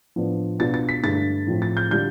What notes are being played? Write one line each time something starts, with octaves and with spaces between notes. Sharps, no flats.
A2 F3 B3 D4
B2 B3 D4 F4 A6
A6
B6
G2 D3 A3 E4 A6
A2 F3 A3 C4 F4
A6
G6
D3 G3 D4 F4 G6